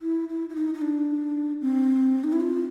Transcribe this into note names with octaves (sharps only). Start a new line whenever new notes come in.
E4
E4
E4
D#4
D#4
D4
C4
D#4
E4
F4